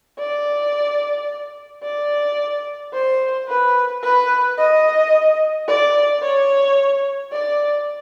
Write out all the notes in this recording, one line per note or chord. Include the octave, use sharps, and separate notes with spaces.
D5
D5
C5
B4
B4
D#5
D5
C#5
D5